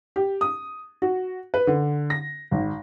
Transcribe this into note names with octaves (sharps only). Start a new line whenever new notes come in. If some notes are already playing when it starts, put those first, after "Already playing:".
G4
D#6
F#4
B4
D3
A#6
G#1